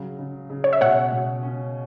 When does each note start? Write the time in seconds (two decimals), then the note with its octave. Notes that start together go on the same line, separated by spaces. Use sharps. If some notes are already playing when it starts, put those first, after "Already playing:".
Already playing: C#3 F#3
0.19 C#3
0.50 C#3
0.64 C#5
0.73 E5
0.81 B2 C#5 F#5
1.12 B2
1.43 C#4